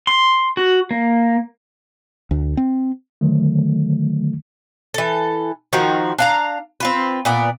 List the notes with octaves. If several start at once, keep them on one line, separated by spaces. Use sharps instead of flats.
C6
F#4
A#3
D2
C4
D3 D#3 F#3 A3
E3 A4
D#3 F3 F#4
D4 F5 A#5
C4 F4 B4
A#2 B3 D5